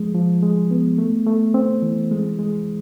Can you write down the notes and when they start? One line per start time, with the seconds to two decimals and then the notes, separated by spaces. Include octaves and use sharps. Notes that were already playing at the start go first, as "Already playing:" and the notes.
Already playing: F3 G#3
0.15 F3
0.43 G#3
0.71 B3
0.98 A3
1.27 A3
1.54 C4
1.82 E3
2.11 G#3
2.39 G#3